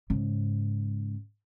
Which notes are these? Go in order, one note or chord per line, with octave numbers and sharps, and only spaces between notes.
G#2 C#3